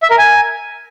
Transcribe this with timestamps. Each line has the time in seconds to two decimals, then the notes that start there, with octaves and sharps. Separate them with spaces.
0.02 E5
0.10 A#4
0.18 G#5